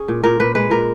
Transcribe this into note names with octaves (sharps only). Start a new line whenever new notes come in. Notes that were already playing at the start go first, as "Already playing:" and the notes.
Already playing: C#4 G#4
A#2
A#2 A#4
A#2 B4
G#3 B4
A#2 A#4